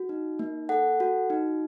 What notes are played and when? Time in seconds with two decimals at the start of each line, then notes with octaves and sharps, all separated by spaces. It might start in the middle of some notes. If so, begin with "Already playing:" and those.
Already playing: F#4
0.09 D#4
0.39 A#3
0.69 A4 F#5
1.00 F#4
1.30 D#4